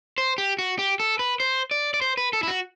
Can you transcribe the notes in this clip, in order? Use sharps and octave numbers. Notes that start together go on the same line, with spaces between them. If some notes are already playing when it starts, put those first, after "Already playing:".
C5
G4
F#4
G4
A4
B4
C5
D5
D5
C5
B4
A4
E4
F#4